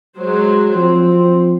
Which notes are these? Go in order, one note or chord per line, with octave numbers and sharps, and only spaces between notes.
F#3 G#3 C5
F3 C4